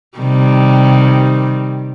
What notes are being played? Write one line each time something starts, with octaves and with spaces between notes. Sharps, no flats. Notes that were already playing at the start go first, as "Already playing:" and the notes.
C3 D#3 G3